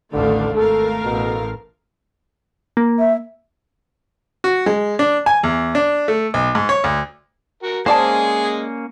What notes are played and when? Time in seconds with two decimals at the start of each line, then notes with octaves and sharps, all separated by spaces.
0.13 A1 D#2 D3 A3 D4 F5
0.54 G#1 A3 A4 A#4 F5
1.04 A1 B2
2.77 A#3
2.99 E5
4.44 F#4
4.66 G#3
4.99 D4
5.26 G#5
5.43 E2
5.75 D4
6.08 A3
6.34 B1
6.55 G#2
6.69 C#5
6.84 D2
7.63 F#4 A#4
7.86 G#3 A#3 C#4 G#4 C5 D5 A5